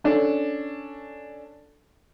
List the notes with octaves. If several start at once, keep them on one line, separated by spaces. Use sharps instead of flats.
C#4 D4 A4